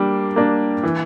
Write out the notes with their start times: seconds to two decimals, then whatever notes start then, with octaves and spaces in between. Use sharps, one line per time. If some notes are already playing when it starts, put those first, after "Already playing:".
Already playing: G3 A#3 D4
0.36 A#3 D4
0.83 E3